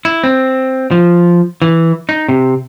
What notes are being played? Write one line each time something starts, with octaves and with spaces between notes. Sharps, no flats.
E4
C4
F3
E3
D#4
C3